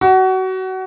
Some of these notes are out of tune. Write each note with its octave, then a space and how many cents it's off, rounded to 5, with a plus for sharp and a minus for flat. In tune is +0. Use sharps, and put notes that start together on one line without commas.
F#4 +25